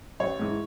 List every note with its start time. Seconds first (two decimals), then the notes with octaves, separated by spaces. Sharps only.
0.20 A1 C#5
0.39 G#2 E3